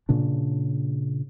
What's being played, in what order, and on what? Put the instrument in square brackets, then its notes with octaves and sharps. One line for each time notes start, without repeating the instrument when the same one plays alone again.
[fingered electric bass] A#2 C#3 D4